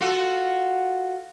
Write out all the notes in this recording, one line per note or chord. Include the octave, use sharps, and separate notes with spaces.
F4 F#4 A4